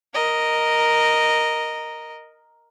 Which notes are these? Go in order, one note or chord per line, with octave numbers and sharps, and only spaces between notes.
A#4 D#5